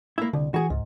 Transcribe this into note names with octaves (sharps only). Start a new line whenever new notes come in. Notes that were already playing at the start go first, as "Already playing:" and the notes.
A#3 E4
C2 D3
E3 F#4 G#4
C#2 G#2